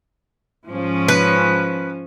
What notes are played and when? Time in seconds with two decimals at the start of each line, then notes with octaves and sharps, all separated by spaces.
0.68 G#2 F3 C#4
1.08 B4